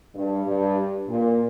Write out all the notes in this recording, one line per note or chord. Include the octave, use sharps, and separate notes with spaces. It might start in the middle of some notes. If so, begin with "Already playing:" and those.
G2
G2
A#2